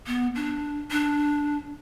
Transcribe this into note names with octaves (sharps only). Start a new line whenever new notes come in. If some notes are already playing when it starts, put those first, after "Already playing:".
B3
D4
D4